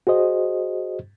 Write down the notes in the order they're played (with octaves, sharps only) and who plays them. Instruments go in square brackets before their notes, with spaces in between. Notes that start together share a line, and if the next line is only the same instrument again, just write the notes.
[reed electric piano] F#4 G#4 C5 D#5